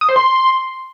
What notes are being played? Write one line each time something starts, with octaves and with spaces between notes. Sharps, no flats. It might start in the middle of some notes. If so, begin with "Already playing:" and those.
D#6
C5
C6